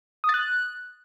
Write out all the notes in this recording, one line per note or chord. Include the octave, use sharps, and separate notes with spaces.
D#6
A6
F#6